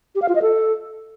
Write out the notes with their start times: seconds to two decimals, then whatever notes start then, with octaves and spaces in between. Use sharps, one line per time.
0.15 G4
0.22 F5
0.29 F4
0.35 D#5
0.42 A4